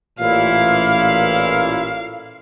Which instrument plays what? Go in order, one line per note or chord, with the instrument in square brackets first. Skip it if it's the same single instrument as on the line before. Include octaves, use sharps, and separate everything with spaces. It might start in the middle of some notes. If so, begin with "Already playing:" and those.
[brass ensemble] A1 A#2 E4 [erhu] F5